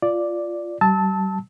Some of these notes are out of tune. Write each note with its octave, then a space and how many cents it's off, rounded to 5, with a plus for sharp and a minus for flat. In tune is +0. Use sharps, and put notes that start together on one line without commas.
F4 -10 D5 +0
G3 -35 A5 +0 E6 -30